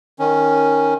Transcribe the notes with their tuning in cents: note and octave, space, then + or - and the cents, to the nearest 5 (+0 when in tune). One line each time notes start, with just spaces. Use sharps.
D#3 +0 C#4 +0